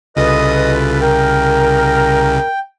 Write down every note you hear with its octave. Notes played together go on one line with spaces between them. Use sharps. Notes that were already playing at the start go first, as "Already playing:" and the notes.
C2 C#3 F4 A4 B4 D#5 D#6
A#4 G5